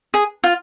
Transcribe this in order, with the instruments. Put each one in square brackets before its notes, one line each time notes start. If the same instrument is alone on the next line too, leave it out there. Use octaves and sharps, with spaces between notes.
[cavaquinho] G#4
F4